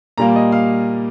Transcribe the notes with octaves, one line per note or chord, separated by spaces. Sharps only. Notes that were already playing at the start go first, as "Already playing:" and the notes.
A#2 G3 A#3 A#5
D#5
F5